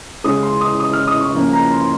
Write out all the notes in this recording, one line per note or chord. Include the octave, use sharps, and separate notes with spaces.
C#3 G#3 C#4 D#6
C6
D#6
D#6
F6
D#6
C#6
C#3 F3 A#3
A#5
C6